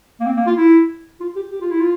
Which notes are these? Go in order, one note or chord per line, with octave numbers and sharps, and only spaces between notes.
A#3
C4
A#3
F4
E4
F4
G4
G4
F4
E4
F4